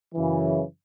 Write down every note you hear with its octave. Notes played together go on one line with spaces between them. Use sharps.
F#2 C#3 E3